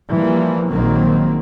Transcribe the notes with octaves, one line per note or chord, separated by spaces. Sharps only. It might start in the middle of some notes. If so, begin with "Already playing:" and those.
E3 F3 G3 A#3
A#1 D#3 F#3 A#3 C4